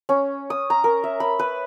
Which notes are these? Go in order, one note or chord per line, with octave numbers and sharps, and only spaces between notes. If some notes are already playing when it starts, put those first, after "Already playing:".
C#4
D#6
A#5
A#4
E5
B5
B4